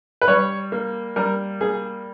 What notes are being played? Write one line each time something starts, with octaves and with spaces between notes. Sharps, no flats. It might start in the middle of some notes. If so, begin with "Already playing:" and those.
B4
G3 C#5
A#3
G3 A#4
A#3 G#4